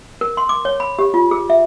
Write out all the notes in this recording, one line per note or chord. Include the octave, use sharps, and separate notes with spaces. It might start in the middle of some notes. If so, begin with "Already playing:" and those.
A#4
C6
D6
C#5
B5
G4
F4
G#4
E5